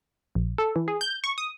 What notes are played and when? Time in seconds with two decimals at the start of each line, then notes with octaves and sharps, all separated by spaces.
0.35 A#1
0.58 A4
0.76 E3
0.88 G#4
1.01 G6
1.24 C#6
1.38 D#6